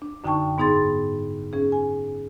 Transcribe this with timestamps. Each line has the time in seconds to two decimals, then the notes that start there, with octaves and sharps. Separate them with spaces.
0.02 D4
0.24 F#2 D3 D#4 G5 A5 C#6
0.58 G#2 B3 D#4 G#4 C6 A6
1.53 C#4 G#4
1.72 G#5